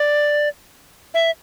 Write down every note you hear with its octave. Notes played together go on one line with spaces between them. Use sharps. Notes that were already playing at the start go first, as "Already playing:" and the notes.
Already playing: D5
E5